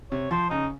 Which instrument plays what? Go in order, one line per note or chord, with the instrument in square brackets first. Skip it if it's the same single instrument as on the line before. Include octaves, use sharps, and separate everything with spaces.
[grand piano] C3 [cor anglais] C#5
[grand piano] F3 [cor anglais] C5
[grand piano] C#3 [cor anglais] D#4